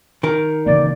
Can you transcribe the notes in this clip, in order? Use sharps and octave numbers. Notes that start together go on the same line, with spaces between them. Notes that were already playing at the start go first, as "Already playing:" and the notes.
D#3 A#4
C#3 E3 A#3 D5